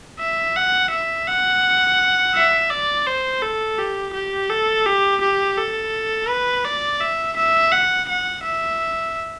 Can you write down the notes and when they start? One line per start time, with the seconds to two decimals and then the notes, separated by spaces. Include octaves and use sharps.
0.19 E5
0.56 F#5
0.91 E5
1.27 F#5
2.35 E5
2.70 D5
3.06 C5
3.42 A4
3.78 G4
4.13 G4
4.50 A4
4.86 G4
5.21 G4
5.58 A4
6.29 B4
6.65 D5
7.01 E5
7.37 E5
7.72 F#5
8.09 F#5
8.43 E5